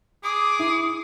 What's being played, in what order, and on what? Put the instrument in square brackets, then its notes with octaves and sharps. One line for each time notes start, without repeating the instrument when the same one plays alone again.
[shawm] G#4 [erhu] D6 [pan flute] D#6
[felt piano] E4